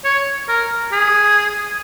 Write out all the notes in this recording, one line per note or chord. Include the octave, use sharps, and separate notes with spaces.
C#5
A#4
G#4